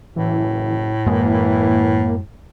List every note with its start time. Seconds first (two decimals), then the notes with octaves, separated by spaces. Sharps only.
0.16 F#1 A2 E3
1.06 F#2 E3 G#3 A#3